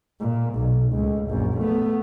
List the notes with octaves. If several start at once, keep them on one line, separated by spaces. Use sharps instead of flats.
A#2
B1
C#2 A2
A#1 F#2
A3 B3